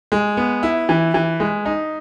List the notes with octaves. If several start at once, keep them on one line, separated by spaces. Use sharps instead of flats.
G#3
B3
E4
E3
E3
G#3
D#4